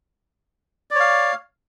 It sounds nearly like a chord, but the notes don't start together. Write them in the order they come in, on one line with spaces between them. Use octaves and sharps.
D5 C#5 F5